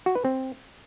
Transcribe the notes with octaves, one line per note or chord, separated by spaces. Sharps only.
F#4
B4
C4